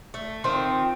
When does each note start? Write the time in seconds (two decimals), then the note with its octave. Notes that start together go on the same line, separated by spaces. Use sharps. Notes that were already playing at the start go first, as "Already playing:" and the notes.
0.14 A3
0.44 D#3 C4 F4